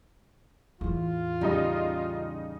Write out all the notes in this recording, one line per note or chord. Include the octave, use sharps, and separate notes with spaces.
E2 A2 F4
C#3 G3 D#4 D#5